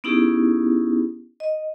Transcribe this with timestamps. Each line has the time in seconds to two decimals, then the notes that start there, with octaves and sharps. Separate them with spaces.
0.04 B3 C#4 D#4 E4 G4 G#4
1.40 D#5